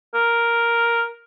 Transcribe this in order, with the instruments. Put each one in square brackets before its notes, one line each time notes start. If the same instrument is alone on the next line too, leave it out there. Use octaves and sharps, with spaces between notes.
[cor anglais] A#4